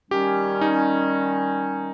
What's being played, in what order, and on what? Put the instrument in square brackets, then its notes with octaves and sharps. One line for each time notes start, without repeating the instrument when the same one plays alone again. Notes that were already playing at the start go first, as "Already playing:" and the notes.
[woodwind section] D#3 G3 C#4 [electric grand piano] G4
[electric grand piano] D#4